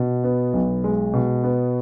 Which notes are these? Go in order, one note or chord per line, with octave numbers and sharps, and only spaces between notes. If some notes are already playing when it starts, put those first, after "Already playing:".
Already playing: B2
B3
B1
G#3
B2
B3